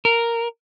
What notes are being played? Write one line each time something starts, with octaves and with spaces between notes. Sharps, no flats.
A#4